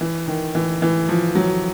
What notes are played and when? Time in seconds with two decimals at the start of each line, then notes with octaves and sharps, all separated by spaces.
0.01 E3
0.28 D#3
0.55 E3
0.82 E3
1.09 F3
1.35 F#3